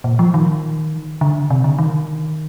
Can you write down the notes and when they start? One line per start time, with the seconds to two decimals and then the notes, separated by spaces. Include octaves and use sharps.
0.04 A#2
0.19 F3
0.34 D#3
1.21 D3
1.50 C3
1.64 D3
1.79 D#3